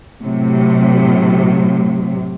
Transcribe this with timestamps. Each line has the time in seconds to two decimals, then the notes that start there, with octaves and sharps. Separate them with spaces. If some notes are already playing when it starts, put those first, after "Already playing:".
0.20 A2 C3 F#3